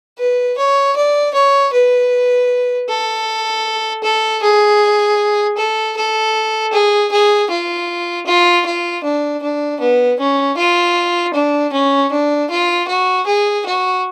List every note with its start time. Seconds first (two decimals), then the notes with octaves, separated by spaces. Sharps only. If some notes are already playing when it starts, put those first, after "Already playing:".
0.18 B4
0.57 C#5
0.96 D5
1.34 C#5
1.73 B4
2.89 A4
4.03 A4
4.42 G#4
5.57 A4
5.96 A4
6.72 G#4
7.11 G#4
7.50 F4
8.26 F4
8.65 F4
9.04 D4
9.42 D4
9.80 B3
10.19 C#4
10.57 F4
11.34 D4
11.73 C#4
12.12 D4
12.50 F4
12.88 F#4
13.26 G#4
13.65 F#4